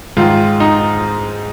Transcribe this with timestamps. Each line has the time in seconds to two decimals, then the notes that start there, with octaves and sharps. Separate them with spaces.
0.17 G#2 D#3 F4
0.60 D#4